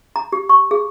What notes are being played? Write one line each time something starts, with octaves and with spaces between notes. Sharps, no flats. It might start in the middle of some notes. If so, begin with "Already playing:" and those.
A#5
G4
C#6
G#4